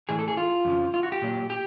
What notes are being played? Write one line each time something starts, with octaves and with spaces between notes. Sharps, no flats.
A2 E3 G#4
A4
G#4
F4
F2 C#3 F3
F4
F#4
G4
A#2 F#3
G4